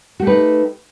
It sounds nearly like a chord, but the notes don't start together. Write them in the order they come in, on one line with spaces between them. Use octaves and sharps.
F#4 A3 G4 B4 D#4